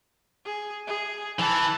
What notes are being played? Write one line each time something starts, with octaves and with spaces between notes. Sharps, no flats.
G#4
G#4
E3 A5